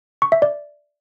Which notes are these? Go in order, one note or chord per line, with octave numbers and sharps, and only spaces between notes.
C#6
E5
D5